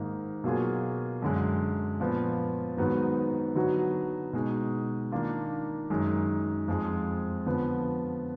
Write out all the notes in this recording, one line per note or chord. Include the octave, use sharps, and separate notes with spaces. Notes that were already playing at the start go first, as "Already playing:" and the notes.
Already playing: G#2 D#3 A#3 D#4
B2 F#3 A#3 F4 G#4
F#2 D3 G#3
A#2 F3 B3
G#2 D#3 F#3 B3 D#4
D3 F#3 B3 D#4 F#4
B2 G#3 D#4
D#3 A#3 D4 F4
F#2 D#3 G#3
F2 F3 G#3
D3 F3 B3